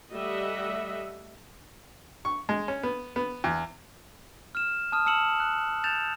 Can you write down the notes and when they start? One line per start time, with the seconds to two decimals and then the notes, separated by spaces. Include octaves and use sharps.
0.11 G3 A3 D#5 E5 F#5
2.25 C#6
2.49 G#3
2.68 C#4
2.83 B3
3.16 B3
3.44 E2
4.55 F6 E7
4.92 A5 D#6 F6
5.06 A5 E6 C#7 E7 F#7
5.40 F#6
5.84 G6 A6 E7 F7